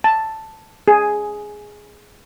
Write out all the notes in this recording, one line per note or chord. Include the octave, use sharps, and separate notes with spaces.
A5
G#4